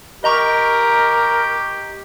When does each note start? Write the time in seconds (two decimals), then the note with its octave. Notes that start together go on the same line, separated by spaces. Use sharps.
0.24 G4 A#4 D#5 A#5 C#6